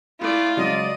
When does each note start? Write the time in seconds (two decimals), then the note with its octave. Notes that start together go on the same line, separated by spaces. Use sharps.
0.21 A3 E4 F4 D5
0.57 C#3 F#3 G#3 D5 D#5